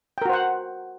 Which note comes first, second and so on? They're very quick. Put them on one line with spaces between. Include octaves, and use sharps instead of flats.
G5 A#4 F#4 C5 F#5